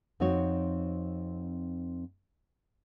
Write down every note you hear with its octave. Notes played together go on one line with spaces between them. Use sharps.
F2 C4 D#4 F#4 C#5